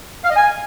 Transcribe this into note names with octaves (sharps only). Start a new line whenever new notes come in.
F5
D#5
G#5